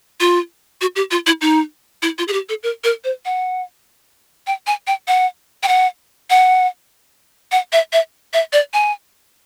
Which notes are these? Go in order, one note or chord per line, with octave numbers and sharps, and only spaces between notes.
F4
F#4
G4
F4
E4
D#4
E4
F4
G#4
G4
A4
A#4
A#4
C5
F#5
G5
G#5
G5
F#5
G5
F#5
F#5
F#5
E5
E5
E5
D5
G#5